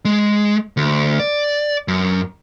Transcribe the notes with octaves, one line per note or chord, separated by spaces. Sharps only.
G#3
D2
D5
F#2